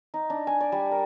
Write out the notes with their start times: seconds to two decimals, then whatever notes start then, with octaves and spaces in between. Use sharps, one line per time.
0.14 D#4
0.30 D4
0.47 G#5
0.61 D5
0.72 G3
0.91 A#4